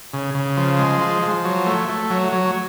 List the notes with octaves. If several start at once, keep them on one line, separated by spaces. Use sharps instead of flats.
C#3
C#3
F3
G#3
F3
F3
F#3
A3
A3
F#3
F#3